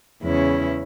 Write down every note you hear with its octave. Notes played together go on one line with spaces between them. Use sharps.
E2 C#3 G#3 C#4 E4